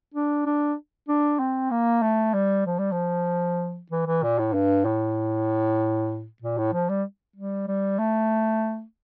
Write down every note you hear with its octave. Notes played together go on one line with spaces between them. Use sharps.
D4
D4
D4
C4
A#3
A3
G3
F3
G3
F3
E3
E3
A#2
A2
G2
A2
A#2
A2
F3
G3
G3
G3
A3